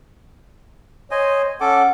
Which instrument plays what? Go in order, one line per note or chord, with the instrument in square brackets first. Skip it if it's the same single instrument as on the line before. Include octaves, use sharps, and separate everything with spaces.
[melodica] C5 D#5 G#5 [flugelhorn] C#5
[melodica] C#4 A4 D6 [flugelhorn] F#5